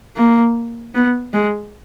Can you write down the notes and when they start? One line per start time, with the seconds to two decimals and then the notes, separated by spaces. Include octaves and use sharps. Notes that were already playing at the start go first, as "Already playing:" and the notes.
0.17 A#3
0.95 B3
1.34 G#3